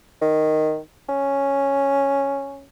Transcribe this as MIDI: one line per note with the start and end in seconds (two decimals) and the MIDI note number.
0.22 0.78 51
1.09 2.67 61